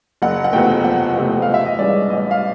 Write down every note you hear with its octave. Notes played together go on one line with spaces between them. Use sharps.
F#1 F#5
F#5
E2 C3 F3 A3 G5
F#1 F#5
E2 C3 F3 A3 F#5
F5
A1
E5
D#5
G2 E3 G#3 C#4 D5
A1 D#5
F5